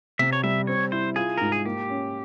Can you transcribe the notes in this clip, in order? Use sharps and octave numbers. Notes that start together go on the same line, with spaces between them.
C3 E5
C#5
G3 E5
C4 C#5
E4 C5
F4 G#4
G#2 A#4
G#4
A#3 G4
C#4